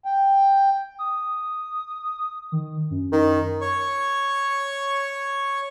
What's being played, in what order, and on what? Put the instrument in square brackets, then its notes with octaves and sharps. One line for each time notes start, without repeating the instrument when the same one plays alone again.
[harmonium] G5
[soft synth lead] D#6
D#3
F#2
[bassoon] D#3
[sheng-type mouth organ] C#5 C#6